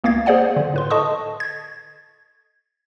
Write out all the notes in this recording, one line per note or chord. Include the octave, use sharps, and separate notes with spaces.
C#2 A#3 B3 F5 G#6 A6
G#4 C5 D5 F#5 G#5
D3
A2 B4 C6
A4 D#5 A5 C#6 D#6
G#6